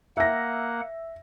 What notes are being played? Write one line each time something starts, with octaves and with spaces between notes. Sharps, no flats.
A#3 E5 F#5 A#6